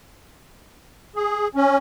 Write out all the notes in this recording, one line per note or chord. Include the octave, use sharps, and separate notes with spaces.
G#4
C#4